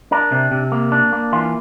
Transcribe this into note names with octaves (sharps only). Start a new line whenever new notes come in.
D4 A#4
C3
C3
A#3
D4
A#3
E3 F4